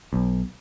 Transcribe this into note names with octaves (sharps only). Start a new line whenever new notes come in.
B1